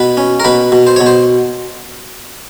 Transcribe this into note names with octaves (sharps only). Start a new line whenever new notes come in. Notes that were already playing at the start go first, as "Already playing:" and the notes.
Already playing: B2 B4
C#4
A#4
B2 B4
B2
C5
B2 C#5
C5